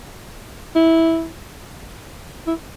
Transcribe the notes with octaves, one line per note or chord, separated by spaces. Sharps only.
E4
E4